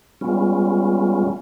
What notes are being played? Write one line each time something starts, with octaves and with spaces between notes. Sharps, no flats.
G3 G#3 B3 C#4 F4